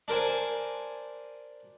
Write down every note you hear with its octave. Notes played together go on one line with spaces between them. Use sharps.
D4 A#4 C5 G#5